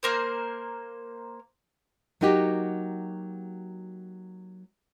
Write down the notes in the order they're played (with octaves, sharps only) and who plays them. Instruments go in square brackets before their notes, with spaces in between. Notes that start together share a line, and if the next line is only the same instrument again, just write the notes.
[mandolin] A#3 A#4 C5
[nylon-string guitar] F#3 A#3 D#4 F#4 G4